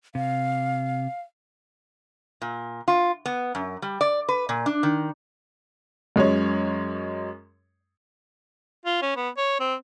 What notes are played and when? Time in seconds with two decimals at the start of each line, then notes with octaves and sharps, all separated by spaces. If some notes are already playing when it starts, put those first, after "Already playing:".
0.15 C3 F5
2.42 A#2
2.88 F4
3.26 B3
3.55 F#2
3.82 G3
4.01 D5
4.29 B4
4.49 A#2
4.66 D4
4.83 D#3
6.16 F#2 G#3 C#4 C#5
8.85 F4
9.02 C#4
9.16 B3
9.37 C#5
9.60 C4